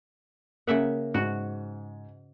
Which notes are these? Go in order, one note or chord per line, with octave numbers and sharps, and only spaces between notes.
C#3 A#3 E5 F#5
G#2 F#4